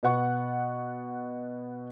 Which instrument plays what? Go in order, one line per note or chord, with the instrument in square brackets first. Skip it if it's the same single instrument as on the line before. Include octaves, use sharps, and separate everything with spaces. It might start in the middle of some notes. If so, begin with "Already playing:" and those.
[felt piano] B2 B3 F#5 C#6